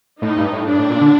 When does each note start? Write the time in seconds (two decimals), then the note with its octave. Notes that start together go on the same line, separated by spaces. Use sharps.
0.21 A2 D#4
0.37 G2
0.53 A2
0.66 G2 D4
0.79 A2
0.89 A#2
1.01 D3